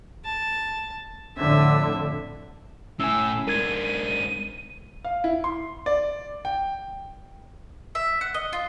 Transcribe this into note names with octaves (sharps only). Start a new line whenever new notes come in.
A5
F2 A2 D3 E5
A2 C#4 G#5 E6
G#2 D4 A#4 G#6 D#7
D#7
F5
E4
C6
D5
G5
E5
F#5
D#5
F4